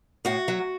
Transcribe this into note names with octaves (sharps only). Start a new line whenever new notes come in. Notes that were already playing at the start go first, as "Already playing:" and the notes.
A2 F#4
F#3